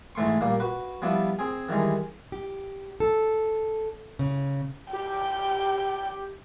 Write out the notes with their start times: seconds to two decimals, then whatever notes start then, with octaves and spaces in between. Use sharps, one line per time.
0.15 G#2 E3 A3 C6 C#6
0.41 A#2 G3 A#3
0.60 F#4 B4
1.02 F3 G3 B3 D4 E4
1.39 C4 G#4
1.69 D#3 E3 G3 G#3
2.32 G4
3.00 A4
4.19 C#3
4.93 G4 G5